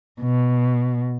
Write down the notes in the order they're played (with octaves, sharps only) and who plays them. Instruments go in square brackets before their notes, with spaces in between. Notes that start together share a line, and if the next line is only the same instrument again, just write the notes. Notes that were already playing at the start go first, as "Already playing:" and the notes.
[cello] B2